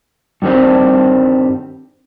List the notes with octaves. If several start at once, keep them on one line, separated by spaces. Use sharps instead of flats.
G2 D#3 G3 C4